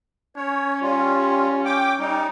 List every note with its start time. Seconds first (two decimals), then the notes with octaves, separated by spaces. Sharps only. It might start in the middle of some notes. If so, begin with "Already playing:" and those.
0.36 C#4 C#5
0.81 G3 F4
1.65 G5 D6
1.98 G3 D#4